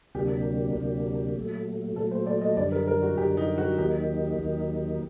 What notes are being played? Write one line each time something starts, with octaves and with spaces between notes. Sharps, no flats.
D2 C3 F#3 A#3 D4 G4
D2 C3 F#3 A#3 D4
A#2 F#3 A3
A#2 F#3 A3 A4
C5
D5
D#5
F#2 D3 G3 D5
A#4
A#4
F#4
F#2 D3 G3 G4
D#4
F#4
D#2 D#3 F#3 A#3 D#4 G4
D#2 D#3 F#3 A#3 D#4